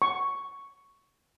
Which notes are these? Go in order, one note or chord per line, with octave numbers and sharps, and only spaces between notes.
C#6